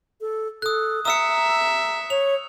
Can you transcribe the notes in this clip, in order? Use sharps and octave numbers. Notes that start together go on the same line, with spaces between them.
A4
A4 D#6 F#6
E5 A#5 D#6 E6 C#7
C#5 F7